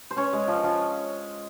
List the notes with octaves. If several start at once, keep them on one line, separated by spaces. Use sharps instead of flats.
C5
C#4 C#5
G#3
F3
F3